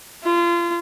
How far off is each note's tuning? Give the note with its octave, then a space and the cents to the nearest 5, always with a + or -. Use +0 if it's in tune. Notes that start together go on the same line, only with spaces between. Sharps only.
F4 -30